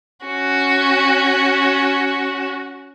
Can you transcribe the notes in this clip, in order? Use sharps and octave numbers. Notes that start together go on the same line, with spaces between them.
C#4 F#4